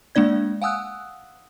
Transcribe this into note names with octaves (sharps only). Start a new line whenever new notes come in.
G#3 A#3 D4 D5 G#6
F5 F#5 G#5 D#6 E6 F#6